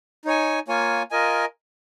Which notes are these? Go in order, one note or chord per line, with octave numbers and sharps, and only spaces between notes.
D#4 C#5 G#5
A#3 F4 C#5 G#5
F4 A#4 D#5 G#5